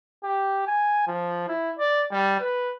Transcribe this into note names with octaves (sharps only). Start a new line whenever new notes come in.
G4
G#5
F3
E4
D5
G3
B4